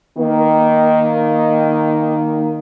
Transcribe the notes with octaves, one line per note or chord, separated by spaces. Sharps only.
D#3 A#3